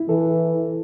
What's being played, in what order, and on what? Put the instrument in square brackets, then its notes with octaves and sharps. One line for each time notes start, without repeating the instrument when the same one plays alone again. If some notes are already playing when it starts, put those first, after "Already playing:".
Already playing: [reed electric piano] E4
[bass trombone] E3 [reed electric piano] A4